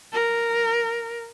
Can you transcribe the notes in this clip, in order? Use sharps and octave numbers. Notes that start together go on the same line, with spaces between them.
A#4